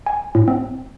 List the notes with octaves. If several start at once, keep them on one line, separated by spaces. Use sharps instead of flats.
G#5
A2
C4